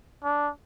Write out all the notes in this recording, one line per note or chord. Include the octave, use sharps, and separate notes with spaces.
D4